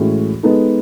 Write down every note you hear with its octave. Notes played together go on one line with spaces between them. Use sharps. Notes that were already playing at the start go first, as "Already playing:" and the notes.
Already playing: A2 E3 G#3 C#4 F#4
G#3 B3 D#4 A4